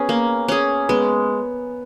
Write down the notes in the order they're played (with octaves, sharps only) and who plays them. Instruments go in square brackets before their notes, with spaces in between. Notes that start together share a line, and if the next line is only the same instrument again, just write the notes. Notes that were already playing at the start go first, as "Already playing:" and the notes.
Already playing: [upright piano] B3 [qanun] C#4 G#4
[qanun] A#3
C#4 G#4
[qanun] G#3 [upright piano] B3